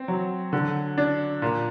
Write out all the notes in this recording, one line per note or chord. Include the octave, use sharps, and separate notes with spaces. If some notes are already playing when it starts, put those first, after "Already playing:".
Already playing: C4
F#3
D3
D4
A#2